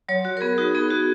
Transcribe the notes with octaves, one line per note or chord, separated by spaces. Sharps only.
F#3 C#5
F#4
A#4
B3 G#4
D#4 F#4
B3 G#4
F#4